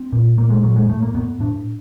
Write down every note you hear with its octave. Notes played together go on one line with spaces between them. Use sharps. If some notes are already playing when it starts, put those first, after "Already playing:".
Already playing: C4
A#2
A#2 A#3
G#3
A#2 F#3
G#3
A2 A3
A#3
A2 B3
A2 D4